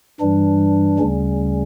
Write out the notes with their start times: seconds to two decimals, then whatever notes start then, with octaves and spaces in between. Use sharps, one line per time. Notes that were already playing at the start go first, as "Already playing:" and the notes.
0.20 G2 E3 G3 D4
0.99 D2 C#3 G3 C#4